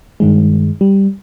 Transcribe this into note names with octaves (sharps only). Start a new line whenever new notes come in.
G2 D#3 G#3
G3